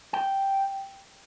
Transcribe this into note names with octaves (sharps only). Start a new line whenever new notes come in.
G5